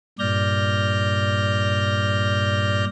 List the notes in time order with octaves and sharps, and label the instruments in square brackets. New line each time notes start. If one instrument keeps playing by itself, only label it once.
[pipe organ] G2 A#2 D5 F6 G6 A#6